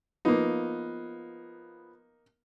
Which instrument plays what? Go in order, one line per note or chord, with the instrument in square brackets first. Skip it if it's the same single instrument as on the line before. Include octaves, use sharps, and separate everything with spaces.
[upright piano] F3 B3 [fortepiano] A#3 D#4